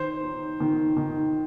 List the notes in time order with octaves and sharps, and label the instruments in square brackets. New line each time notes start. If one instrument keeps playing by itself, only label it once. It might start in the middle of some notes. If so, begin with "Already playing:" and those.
Already playing: [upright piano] D#3 C5
D#4
D#3
D#3